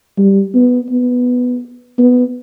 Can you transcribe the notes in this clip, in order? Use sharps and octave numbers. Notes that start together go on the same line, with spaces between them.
G3
B3
B3
B3